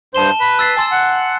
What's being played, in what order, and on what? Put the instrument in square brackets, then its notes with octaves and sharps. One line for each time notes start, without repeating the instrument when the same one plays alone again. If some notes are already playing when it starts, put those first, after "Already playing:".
[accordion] G2 C5 [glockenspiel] A5 E7 G7
[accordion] B4
[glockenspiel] E6 A6 C7
[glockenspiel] G#5 C6 E6 [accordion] A5
[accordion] F#5